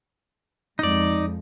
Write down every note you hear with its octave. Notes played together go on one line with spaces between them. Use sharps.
F2 G#3 D#4 D5